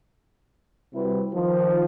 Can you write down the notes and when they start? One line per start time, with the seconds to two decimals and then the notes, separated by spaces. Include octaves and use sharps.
0.94 C3 G3 C4 E4 F#4 B4
1.33 D#3 F3